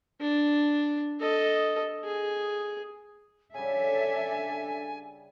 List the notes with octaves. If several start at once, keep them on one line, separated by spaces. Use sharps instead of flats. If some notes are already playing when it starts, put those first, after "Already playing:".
D4
A4 D#5
G#4
C#3 G3 D4 A4 E5 G#5